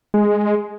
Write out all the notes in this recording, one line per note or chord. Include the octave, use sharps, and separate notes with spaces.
G#3